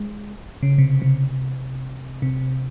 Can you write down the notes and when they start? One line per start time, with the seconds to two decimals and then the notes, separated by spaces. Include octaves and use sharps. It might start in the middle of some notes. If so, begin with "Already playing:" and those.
Already playing: G#3
0.63 C#3
0.78 C3
1.02 C3
2.22 C3